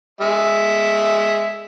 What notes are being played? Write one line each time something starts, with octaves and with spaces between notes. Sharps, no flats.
G#3 E5